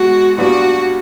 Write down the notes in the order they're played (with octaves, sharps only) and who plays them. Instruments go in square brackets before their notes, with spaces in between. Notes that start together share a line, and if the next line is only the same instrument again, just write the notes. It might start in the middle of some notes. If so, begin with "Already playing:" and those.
Already playing: [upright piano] B2 G#3 [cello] F#4
[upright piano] A#2 G3 B3 D4 F4 [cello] F#4